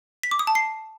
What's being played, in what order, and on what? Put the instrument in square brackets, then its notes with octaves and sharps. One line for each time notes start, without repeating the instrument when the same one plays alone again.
[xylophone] B6
D6
D#6
A5
C7